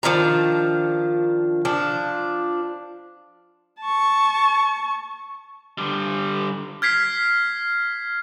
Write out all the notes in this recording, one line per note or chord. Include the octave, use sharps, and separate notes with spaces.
D#3 F3 D4 A#5
F3 D4
A5 C#6
D3 G3
F6 G#6 B6 C7